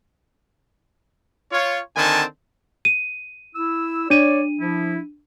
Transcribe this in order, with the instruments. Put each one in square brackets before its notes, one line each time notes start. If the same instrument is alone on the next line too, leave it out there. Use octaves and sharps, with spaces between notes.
[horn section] F4 C#5
D3 D#3 C4 G#5 A5
[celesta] D#7
[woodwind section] E4 E6
[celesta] D4 D#7 [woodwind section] C#5 D5
[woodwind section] F3 E4